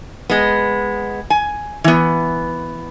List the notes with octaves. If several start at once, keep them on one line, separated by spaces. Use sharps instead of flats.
G#3 B3
G#5
E3 B3